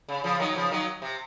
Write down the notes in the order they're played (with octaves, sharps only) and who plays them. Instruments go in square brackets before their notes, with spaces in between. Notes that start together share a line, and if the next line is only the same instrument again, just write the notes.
[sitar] C#3
C#3 F3
D#3 F#3
C#3 F3
D#3 F#3
C3